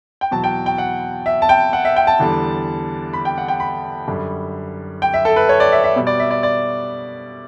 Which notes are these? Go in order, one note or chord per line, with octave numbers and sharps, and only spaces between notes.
G5
E2 B2 F#3 A5
G5
G5
F#5
E5
A5
G5
F#5
E5
G5
A5
E2 D3 G3
B5
G5
F#5
G5
B5
F#2 D3 G3
G5
E5
A4
B4
C#5
D5
E5
E5
B2 G3
D5
E5
D5
D5